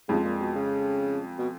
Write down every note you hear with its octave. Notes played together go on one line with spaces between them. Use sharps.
F2 C#3 F3 G#3
A#2
B2
C#3
B2